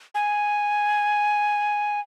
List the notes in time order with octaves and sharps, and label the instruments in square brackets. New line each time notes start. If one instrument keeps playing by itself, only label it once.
[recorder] G#5